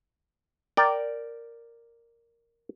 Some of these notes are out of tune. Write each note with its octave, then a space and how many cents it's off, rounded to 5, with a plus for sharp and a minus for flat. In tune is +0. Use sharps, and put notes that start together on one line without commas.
A#4 -5 D5 +0 G5 -10